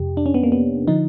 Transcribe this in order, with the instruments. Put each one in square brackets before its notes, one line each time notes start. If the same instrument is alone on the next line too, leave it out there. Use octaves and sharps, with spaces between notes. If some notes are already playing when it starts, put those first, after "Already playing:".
Already playing: [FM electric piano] F2 C3 G4
D4
C#4
B3
A#3
B3
D3 F3 D#4